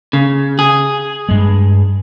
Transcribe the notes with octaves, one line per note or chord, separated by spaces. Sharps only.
C#3
G#4
G2 G#3